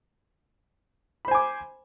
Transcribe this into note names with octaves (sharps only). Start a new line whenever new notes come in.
C5 G#5 B5 D6